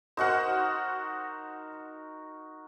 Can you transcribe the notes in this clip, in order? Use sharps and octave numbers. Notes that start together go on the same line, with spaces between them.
D#4 F#4 A#4 C5 F#5